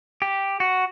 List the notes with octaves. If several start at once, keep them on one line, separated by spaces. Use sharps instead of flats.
G4
F#4